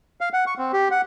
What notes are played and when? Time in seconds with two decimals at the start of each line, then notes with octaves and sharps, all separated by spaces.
0.21 F5
0.33 F#5
0.47 C#6
0.58 C4
0.73 G4
0.91 F#5